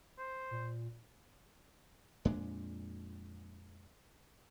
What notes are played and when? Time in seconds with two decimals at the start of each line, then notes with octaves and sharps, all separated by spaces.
0.18 C5
0.51 A#2
2.25 F2 A#2 G#3 D4